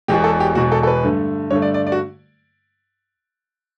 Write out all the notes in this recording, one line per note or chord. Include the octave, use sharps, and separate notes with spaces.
E1 E2 B2 G4
A4
G4
E1 E2 B2 F#4
A4
A4
B4
G2 D3 A3
G2 D3 A3 C#5
D5
D5
D5
F#4